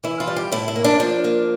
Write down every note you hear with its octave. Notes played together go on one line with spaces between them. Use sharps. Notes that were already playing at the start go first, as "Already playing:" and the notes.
E3 E4
F4
G3
G4
A2 E4
E4
A#3
D4
F3 D4
A#3